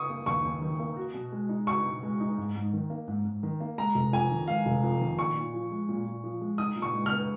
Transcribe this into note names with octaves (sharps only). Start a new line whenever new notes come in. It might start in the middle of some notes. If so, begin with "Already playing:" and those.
Already playing: C#6 D#6
A#3
D#2 C#6
D#2
D#3
A#3
F#4
B2
G#3
D#4
F#4 C#6
B2
G#3
D#4
G#2
G#2
D#3
A#3
G#2
G#2
D#3
A#3
G#3 A#5
F1
F2 G#5
D#3
G#3 F5
F1
F2
D#3
A#2 C#6
A#2
F3
G#3
A#2
A#2
F3
G#3
D#4 D#6
A#2
C#6
G#3
F6
B3